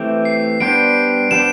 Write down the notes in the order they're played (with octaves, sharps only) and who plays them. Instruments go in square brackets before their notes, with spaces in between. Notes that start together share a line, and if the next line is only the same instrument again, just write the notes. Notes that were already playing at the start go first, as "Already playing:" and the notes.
Already playing: [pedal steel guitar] E3 A3 C4 G4
[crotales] C7
[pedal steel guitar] G3 B3 D4 G4 C5 [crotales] D7
[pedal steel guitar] G3 B3 D4 G4 C5 [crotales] E7